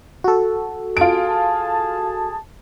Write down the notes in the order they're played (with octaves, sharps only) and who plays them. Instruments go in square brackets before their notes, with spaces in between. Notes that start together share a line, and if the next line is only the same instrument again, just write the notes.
[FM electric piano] F#4 A4
[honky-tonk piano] F4 D7 [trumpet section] G#4 A5